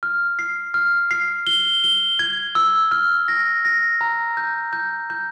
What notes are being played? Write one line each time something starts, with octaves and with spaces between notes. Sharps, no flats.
F6
C7
F6
C7
G7
G7
G#6
E6
F6
A#6
A#6
A#5
G6
G6
G6